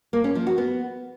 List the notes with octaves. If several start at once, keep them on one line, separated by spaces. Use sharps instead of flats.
A#3
C#4
F3
F#4
B3